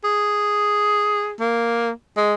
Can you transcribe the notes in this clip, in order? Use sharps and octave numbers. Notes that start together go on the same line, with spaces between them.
G#4
A#3
G#3